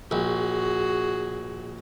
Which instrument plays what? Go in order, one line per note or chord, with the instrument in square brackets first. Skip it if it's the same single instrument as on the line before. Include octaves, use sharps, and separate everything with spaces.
[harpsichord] A#1 [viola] F#4 G#4